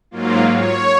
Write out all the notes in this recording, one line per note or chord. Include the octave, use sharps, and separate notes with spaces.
G#2 F#3 A#3 F4
C#5